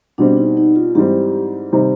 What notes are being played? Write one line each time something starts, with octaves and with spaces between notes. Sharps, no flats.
B2 G3 C4 D4
D#4
D#4
F4
G#2 E3 G3 C4 G4
C3 D#3 G3 C4 D#4